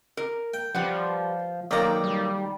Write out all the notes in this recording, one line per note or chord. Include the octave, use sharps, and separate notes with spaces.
A#4
G5
F3 G3 B4 F#5
B1 D#3 A#3 D5 A#5
G3